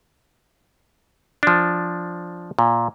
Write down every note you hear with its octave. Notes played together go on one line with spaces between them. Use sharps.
F3 D4
A#2